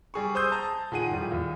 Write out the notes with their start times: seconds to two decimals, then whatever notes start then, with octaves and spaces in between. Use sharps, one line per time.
0.14 G3 G#4 C#6
0.35 C5 C6 D#6 E6 G6
0.52 A5 A#5
0.92 A#2 D#3 G#4 F#5 D#7
1.11 A2 F3 G3
1.31 D#2 A#2